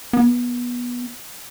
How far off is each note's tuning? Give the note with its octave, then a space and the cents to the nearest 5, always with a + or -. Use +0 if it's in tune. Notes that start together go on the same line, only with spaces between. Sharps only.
B3 -20